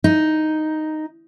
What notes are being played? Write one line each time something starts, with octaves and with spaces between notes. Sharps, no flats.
D#4